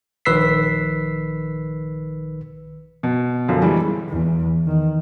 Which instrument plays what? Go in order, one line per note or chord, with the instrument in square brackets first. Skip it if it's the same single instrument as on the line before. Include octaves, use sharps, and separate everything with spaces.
[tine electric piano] A#1 D#3 B4 E6 B6 C7
[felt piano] B2
F#2 D3 F3
E3 G3 G#3
[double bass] E2
D#3